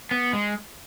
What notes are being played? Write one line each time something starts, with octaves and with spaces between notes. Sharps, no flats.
B3
G#3